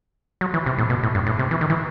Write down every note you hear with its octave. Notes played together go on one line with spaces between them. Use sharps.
F#3
E3
C3
A2
B2
A2
G2
A2
C3
E3
D#3
E3